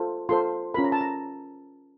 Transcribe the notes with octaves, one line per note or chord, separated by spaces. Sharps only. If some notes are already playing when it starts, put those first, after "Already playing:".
Already playing: F4 A4 C5
F4 A4 C5 C6
C#4 F4 A#4 B5
A#5
A5
A#5